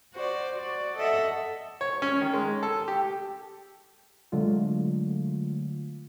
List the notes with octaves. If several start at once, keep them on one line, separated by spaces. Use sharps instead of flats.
F#4 C5 D5
F#4 D5
A4 D#5 E5 F#5
C#5
C#4
D#3
G#3
A4
G4
D3 F#3 G#3 A3 F4